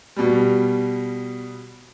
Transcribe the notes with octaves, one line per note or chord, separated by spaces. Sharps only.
B2 G3